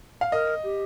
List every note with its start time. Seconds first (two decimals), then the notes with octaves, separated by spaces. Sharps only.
0.21 F5
0.32 A#4 D#5
0.63 G4